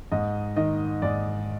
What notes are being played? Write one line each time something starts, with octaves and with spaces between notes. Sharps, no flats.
G#2 D#5
D#3 D#5
G#2 D5